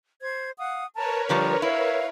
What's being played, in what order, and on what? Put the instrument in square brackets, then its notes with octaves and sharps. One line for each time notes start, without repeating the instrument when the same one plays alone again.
[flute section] C5 G#6
F5 F#5 D#6
[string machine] A#4 B4 C#5 [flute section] A5 A#5
[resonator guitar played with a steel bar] D3 F3 G3 [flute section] A#5 C#6 F6
[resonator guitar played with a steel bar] E4 [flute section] F5 G#6